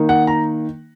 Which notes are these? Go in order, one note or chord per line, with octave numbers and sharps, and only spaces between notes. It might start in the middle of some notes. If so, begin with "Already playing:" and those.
Already playing: D#3 A#3 D#4
F#5
A#5